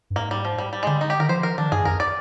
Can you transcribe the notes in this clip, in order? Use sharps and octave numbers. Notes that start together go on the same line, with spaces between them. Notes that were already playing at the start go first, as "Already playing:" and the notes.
G2
G#2 A#3
G3
F3
G3
G3
G#3
D3 G3
D#4
G4
D#3 A#4
F3 C5
A#4
D#3 D4
G2 G#4
F2 A#4
D5